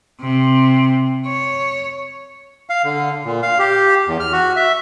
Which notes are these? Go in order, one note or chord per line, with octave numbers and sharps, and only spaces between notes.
C3
C#5
F5
D3
A#2
F5
G4
E2
F6
F#4
E5